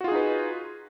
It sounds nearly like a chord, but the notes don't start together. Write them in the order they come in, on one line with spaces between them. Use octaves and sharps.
F#4 F4 G#4 D#4 B4